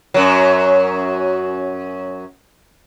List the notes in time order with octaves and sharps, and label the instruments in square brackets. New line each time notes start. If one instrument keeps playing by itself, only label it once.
[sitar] F#2 F#3